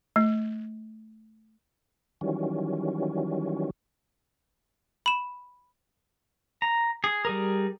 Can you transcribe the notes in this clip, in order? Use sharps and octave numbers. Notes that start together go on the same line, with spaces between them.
A3
D#3 E3 F#3 G3 C#4
B5 E7
A#5
G#4
G3 G#4 A#4